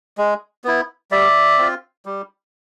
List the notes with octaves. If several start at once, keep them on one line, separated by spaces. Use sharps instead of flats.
G#3
B3 E4
G3 D5 E5
C4 F4
G3